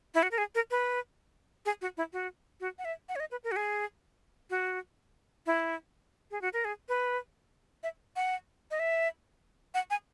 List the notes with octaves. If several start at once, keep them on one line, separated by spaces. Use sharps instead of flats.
E4
F#4
A#4
G#4
A#4
B4
G#4
F#4
E4
F#4
F#4
F#5
E5
F#5
C#5
D#5
B4
A#4
F#4
G#4
F#4
E4
G#4
F#4
A#4
G#4
B4
E5
F#5
D#5
E5
F#5
G#5